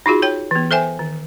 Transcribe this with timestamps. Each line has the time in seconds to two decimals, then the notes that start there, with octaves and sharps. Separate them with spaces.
0.06 D#4 F4 F#4 G#4
0.22 C#5 G5
0.51 E3 B3
0.71 A4 C5 E5 G5 G#5
0.99 D#3